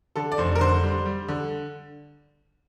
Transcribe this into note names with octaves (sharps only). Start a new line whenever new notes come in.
D3 A4
D5
F1 C5
A#4
D3 C5
G3
G3
D3